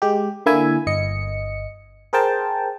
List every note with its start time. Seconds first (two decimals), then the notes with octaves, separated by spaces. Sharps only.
0.02 G#3 G4
0.46 D3 A#3 E4 E5 G#5
0.87 G1 D#5 C#7
2.13 G#4 A#4 C5 G5 A5